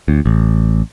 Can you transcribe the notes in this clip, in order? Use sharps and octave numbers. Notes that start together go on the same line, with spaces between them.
D2
A1